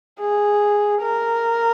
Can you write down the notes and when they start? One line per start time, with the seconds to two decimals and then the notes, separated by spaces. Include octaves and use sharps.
0.21 G#4
1.02 A#4